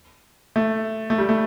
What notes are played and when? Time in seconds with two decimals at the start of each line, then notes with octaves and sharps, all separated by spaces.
0.56 A3
1.10 A3
1.18 G3
1.29 A3